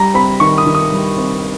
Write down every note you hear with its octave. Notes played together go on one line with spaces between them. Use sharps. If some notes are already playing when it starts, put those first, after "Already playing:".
Already playing: G3 A#5
C4 B5
D#3 C#6
D#6
D#3
D#6
G3
C4